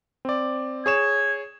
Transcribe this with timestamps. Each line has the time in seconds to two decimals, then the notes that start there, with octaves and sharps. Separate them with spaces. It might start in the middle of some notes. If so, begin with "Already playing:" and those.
0.25 C4 D5
0.86 G#4 C#5 G#6 E7